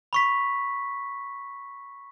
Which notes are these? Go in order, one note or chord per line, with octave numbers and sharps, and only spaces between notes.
B5 C#6 B6